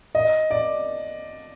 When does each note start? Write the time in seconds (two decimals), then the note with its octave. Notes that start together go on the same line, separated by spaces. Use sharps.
0.15 D#5
0.51 D5